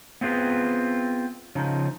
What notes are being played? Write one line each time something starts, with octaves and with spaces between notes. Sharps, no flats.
B3 C4 F4 G#4 B4
C#3 F3 D#4